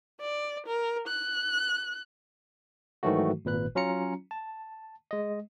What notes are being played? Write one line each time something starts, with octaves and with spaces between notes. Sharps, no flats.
D5
A#4
F#6
G#2 D#3 E3 F#3 A3 F#4
G#1 A#2 B4 F#6
F#3 C#4 F4 A#5 C#7
A5
G#3 D#5